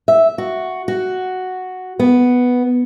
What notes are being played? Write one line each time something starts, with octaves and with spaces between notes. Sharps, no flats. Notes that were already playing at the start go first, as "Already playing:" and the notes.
E5
F#4
F#4
B3